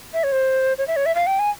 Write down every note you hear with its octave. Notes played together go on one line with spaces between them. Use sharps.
E5
C#5
C5
C#5
E5
C#5
E5
F5
G5
G#5